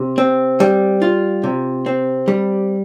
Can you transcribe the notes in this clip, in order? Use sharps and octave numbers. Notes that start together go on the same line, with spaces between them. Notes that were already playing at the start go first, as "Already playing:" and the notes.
Already playing: C3
C4
G3
F4
C3
C4
G3